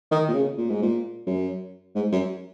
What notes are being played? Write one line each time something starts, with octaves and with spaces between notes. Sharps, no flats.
D#3
A#2
C#3
A#2
G#2
A#2
F#2
G#2
F#2